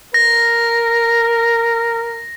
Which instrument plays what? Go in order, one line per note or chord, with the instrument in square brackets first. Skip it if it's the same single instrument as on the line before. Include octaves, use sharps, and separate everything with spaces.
[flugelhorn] A#4 [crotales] A#6